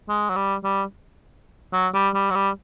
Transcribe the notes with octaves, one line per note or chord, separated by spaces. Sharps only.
G#3
F#3
G3
G3
F#3
G3
G3
F#3
G3